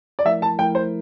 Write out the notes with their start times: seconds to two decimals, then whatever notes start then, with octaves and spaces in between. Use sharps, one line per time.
0.19 D5
0.25 F3 A3 E4 A#4 E5
0.42 A5
0.59 F3 A3 E4 A#4 G5
0.75 C5